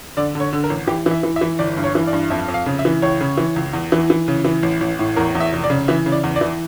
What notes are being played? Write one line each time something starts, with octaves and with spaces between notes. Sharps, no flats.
D3 D5
D3
C#5
D3
A#4
A1
E3 G4
E3
E5
E3
E5
E3
G1 D5
G2
C#5
E3
D5
G2
F2 E5
F2
F5
C#3
E5
E3
C#2 C#5
C#3
E3
C#2
E2
E3
E3
C#3
E3
A1
A1
A2
E2 A#4
E2
E5
F1
D5
C#3
E3 E5
C#3
D5
E2
D5
E3